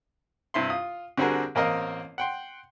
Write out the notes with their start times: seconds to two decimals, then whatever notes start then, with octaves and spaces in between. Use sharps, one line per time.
0.54 G2 C3 E4 C6
0.70 F4 D#6
1.17 D3 G3 C4 F#4 G#4 A#4
1.55 A1 A#3 C4 A#4 D#5 F5
2.18 F#5 G5 C6